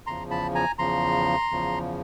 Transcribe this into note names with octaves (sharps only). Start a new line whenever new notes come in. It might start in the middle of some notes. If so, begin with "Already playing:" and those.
E2 C#3 F3 A#5 C6
A5 B5
G#5 A#5
E2 C#3 F3 A#5 C6
E2 C#3 F3